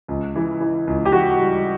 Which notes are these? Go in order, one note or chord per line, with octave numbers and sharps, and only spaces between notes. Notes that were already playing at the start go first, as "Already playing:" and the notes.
C#2
E3
E3
C#2
G4
E3 F#4
G3